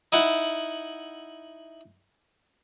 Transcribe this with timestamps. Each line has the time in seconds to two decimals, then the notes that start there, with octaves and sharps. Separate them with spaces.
0.12 D#4 E4 F#5